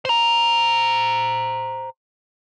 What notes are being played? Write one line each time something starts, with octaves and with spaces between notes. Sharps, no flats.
C5 A#5